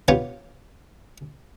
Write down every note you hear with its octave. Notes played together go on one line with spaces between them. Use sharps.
B3 F4 G4 C#5